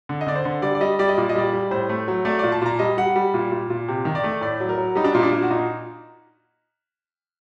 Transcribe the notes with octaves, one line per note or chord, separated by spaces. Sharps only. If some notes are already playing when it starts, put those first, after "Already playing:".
D3
D#5
D3 D5
C5
D3
G3 D5
D5
G3 D#5
G3 D5
D#5
A#2 D5
D#5
G3 D5
G3
A2 C5
A3
F#3
A3 D5
A#2 D5
A5
A#2 A#5
G3 D#5
G3 F#5
G3
A#2
A#2
A#2
C3
D#3
D5
A3
A2 D5
F#3
A#4
F#3
G3 D#4
D4
A#2 D#4
D4
A#2
F#4
A#2 D#4